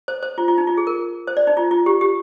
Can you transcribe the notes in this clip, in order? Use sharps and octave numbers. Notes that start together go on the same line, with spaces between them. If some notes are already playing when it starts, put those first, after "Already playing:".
C5
C5
F4
F4
D#4
F4
G#4
A#4
C5
D5
D#4
F4
F4
G4
G4